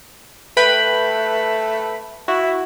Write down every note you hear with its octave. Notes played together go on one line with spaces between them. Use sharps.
A3 B4 G5 B5
E4 F#4